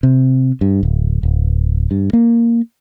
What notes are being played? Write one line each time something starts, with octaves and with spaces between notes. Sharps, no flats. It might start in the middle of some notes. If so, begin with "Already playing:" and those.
C3
G2
D1
D1
G2
A#3